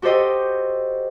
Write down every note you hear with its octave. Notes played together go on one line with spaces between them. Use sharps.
F#4 G4 A4 C5 D#5 G5